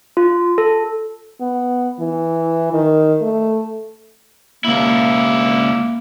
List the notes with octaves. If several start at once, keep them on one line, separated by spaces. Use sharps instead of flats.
F4
A4
B3
E3
D#3
A3
C#2 A#3 E4